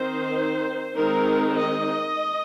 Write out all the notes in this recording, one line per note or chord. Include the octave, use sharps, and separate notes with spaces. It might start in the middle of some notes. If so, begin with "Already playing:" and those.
Already playing: D#3 C4 D#4 C5
D#3 G#3 C4 D#4 A#4
D#5